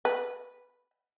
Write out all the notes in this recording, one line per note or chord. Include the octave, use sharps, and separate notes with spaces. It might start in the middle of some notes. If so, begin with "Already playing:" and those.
B4